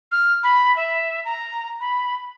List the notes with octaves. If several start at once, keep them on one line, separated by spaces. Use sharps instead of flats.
F6
B5
E5
A#5
B5